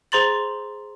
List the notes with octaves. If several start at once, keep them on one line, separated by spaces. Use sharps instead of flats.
G#4 C5 A#5 C6 A6 F#7